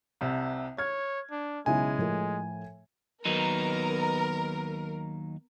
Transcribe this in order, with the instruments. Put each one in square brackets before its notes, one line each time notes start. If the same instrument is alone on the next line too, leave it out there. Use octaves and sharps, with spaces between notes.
[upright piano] C2 C3
[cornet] C#5 [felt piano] F6 [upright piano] G#6
[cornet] D4
[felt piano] B1 C#3 E4 [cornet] G#3 [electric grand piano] G#5
[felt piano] A2 F3 A#4
[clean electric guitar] D#2 F#3 D#4 [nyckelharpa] B3 A#5 [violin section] A#4